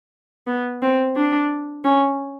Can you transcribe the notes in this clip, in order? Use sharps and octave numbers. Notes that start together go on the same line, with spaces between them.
B3
C4
D4
C#4